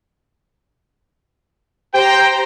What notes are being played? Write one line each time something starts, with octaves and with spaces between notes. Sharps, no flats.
G4 C5 G5 A#5